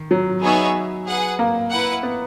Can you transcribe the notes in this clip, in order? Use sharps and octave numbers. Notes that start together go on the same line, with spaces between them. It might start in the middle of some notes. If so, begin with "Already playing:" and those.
Already playing: D#3
F#3
B3 D#4 G#4 C#5 E5
G#4 B4 F#5
A#3
E4 B4 F#5
B3